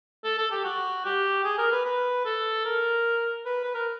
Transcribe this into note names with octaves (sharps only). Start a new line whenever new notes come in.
A4
A4
G4
F#4
G4
G#4
A#4
B4
B4
A4
A#4
B4
B4
A#4